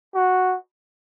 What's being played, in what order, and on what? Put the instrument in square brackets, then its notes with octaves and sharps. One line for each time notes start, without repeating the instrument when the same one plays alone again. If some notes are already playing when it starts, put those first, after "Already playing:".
[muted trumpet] F#4